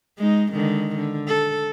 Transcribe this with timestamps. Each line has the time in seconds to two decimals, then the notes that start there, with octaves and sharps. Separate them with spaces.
0.18 G#3 D#4
0.52 D3 D#3 G#3
0.95 D3
1.27 A4